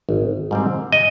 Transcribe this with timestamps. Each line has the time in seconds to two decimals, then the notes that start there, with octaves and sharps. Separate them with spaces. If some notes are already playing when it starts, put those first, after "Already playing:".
0.09 G#1
0.51 G#2 G3 C4
0.92 D#5